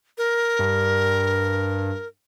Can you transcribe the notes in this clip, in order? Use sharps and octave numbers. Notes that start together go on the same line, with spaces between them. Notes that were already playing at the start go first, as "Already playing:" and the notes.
A#4
G2